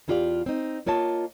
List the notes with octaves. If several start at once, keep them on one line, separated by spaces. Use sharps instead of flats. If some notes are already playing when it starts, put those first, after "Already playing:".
E2 E4 F4 G4 D5 F5
C4 D#4
A#3 F4 C#5 D#5 A5